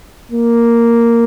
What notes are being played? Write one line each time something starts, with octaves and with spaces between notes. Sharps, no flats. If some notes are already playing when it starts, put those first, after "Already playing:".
A#3